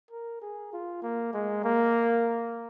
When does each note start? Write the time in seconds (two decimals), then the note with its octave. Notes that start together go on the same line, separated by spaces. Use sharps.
0.11 A#4
0.42 G#4
0.73 F4
1.02 A#3
1.33 G#3
1.64 A#3